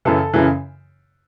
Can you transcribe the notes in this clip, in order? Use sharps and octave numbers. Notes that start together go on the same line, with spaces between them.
F#2 C#3 E3 A4
F#2 C#3 E3